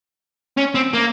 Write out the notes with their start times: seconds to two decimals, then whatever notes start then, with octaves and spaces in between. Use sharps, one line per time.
0.57 C#4
0.75 C4
0.93 A#3